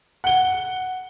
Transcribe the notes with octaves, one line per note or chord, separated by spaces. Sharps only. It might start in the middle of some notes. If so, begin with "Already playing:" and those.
F#5 G7